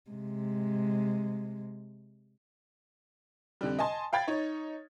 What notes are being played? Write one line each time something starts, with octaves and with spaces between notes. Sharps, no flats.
C3 G#3
F2 D3 G3
D#5 G#5 A5 C6
F5 G5 B5 G#6 A6
D#4 C#5